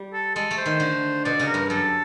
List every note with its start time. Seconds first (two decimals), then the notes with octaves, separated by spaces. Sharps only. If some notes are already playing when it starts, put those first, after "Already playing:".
Already playing: G3
0.13 A4
0.35 G#3 A4
0.51 A3
0.57 C5
0.66 D#3
0.80 D3
1.24 B2 D5
1.40 C#3
1.47 A#4
1.54 G2
1.69 F#2 A4